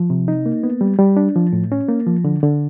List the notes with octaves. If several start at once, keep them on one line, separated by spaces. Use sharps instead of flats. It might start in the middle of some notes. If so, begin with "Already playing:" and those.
Already playing: F3
C3
D#4
A#3
B3
G3
G3
D4
F3
A2
C#4
A#3
F3
D3
D3